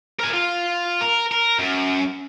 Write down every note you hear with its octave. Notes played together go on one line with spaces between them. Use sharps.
A#4 G#5
F4
A#4
A#4
F#2